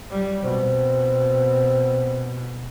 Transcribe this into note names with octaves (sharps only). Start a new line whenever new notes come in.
G3
B2 C4